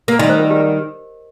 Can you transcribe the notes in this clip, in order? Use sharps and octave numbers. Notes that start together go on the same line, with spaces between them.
A#3
D#3 G3 D#5
C5
A#4
G4
G4